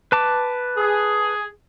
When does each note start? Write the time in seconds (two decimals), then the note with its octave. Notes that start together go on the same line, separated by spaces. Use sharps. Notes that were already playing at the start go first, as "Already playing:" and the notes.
0.12 B4 A5 D6
0.77 G#4